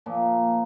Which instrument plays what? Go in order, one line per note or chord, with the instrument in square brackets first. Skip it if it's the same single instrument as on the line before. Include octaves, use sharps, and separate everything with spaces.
[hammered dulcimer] A#2 F3 A#3